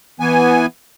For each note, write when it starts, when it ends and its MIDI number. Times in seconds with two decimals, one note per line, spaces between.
0.20 0.66 52
0.20 0.66 59
0.20 0.66 80